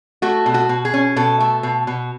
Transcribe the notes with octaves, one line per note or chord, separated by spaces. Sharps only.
A3 F#4
B2
F#4
B2
G#4
C#4
B2 A4
A3
B2
B2